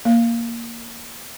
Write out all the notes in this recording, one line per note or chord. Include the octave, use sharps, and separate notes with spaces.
A#3